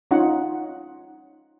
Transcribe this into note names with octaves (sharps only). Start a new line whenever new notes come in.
C#4 D#4 F4 F#5